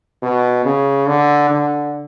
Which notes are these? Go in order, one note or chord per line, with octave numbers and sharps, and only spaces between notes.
B2
C#3
D3
D3